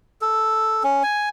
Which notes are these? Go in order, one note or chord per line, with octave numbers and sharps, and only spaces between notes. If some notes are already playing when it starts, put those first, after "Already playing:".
A4
C#4
G#5